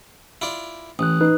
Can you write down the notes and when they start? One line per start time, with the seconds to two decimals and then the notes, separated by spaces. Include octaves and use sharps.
0.42 E4 F4 D5
0.99 A1 D#6 F#6
1.21 D#4 B4